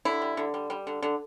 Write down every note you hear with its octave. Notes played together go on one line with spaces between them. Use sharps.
D3 E4
G3
D3
G3
G3
D3
D3